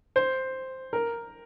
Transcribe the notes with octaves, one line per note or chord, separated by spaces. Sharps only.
C5
A#4